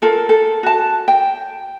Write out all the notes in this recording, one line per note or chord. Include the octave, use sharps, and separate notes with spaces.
F4 A4 A#4
A4
F#4 A5
G5